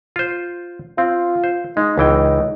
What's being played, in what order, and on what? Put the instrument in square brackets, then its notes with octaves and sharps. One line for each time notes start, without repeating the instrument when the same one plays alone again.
[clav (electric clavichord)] F4 C5
[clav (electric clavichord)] C4 [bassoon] F4
[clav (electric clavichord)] C5
[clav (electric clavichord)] G#3 [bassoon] D#4
[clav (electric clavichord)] C#2 E3 G5